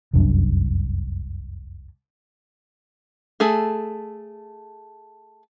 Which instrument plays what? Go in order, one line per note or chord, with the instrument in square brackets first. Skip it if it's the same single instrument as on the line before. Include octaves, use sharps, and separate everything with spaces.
[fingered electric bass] F1 C2 F#2 D4
[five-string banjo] A3 G#4 A4